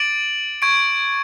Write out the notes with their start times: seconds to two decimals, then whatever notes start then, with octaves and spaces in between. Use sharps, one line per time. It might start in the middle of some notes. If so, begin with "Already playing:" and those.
Already playing: D6 A6 D7 F#7
0.62 C#6 G#6 D7